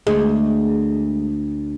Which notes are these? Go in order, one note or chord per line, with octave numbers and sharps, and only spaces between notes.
D2 G#3